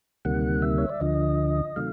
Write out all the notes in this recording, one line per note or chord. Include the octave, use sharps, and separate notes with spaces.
D2 C3 D#3 G3 A#3 F#5
E5
C#5
D5
D2 D3 F3 D#5
C3 D#3 F#3 A3 F5